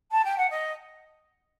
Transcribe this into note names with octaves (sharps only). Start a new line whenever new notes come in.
A5
G5
F#5
D#5